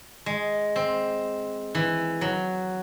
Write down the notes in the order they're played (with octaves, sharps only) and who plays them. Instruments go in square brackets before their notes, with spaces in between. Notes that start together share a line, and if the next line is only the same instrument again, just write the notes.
[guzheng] G#3
C4
E3
F#3